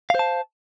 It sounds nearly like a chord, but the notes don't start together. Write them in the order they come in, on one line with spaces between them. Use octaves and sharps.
F5 C5 A5